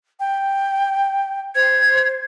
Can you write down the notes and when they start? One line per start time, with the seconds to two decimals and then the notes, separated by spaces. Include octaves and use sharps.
0.20 G5
1.56 C5 G#6